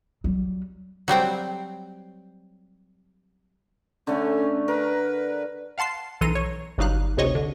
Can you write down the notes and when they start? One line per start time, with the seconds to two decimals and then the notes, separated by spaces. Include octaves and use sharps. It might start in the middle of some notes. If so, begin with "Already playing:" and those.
0.24 F#3 G3
1.08 F#3 G3 C4 G5
4.07 D3 A3 C#4
4.68 A#4 B4
5.78 F5 F#5 A5 C6 C7
6.21 B1 E3 A4 A#5 C6 D#7
6.35 C#5
6.78 G1 F#3 G3 D#4 F5 F#6
7.17 G#1 D2 C3 C#5 D#5 C#6
7.35 D3